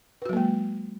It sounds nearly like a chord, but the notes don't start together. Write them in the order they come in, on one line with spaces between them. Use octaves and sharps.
B4 F#4 F#3 A#3 G#3